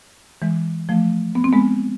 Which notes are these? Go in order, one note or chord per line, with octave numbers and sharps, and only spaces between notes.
E3 G#3
F3 A3
B3
C4
G#3 B3